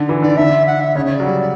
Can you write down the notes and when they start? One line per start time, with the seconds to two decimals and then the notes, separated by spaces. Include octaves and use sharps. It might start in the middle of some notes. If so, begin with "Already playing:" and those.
Already playing: D3
0.09 E3
0.22 D3 D5
0.37 D3 E5
0.67 F#5
0.80 E5
0.95 C#3 C#5
1.05 C#5
1.15 F#3 D5
1.24 G3